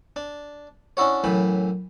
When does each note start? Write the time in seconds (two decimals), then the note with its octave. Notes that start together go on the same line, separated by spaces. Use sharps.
0.16 D4
0.97 C#4 D4 E4 F#4 C#5
1.24 F#2 A2 E3 B5